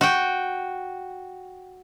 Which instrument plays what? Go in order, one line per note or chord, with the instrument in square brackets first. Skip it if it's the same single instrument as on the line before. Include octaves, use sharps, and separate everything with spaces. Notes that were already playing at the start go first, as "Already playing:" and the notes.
[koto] F#4 G5